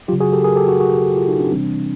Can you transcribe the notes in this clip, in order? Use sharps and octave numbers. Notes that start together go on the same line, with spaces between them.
C#3 F#3 F4 G4
F#4 G#4
G4 A4
G#4 A#4
G4 A4
F#4 G#4
F#4 G#4
F4 G4
D#4 F4
C4 D4
C3 E3 G3 C4 D4